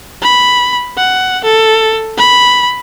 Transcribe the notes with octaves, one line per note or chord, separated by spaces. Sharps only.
B5
F#5
A4
B5